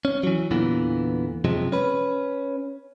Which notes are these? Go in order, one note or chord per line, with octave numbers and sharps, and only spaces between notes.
C#4
E3 F#3
E2 A#2 D3 E3 B3
F#2 C3 F3 G#3
C#4 B4